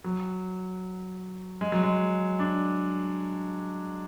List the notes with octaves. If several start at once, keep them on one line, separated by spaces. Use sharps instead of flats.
F#3
G#3
F#3
G#3
D4